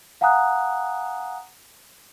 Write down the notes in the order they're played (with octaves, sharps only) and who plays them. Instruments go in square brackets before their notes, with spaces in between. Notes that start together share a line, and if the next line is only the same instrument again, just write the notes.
[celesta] F5 F#5 G#5 A#5 D#6 F#6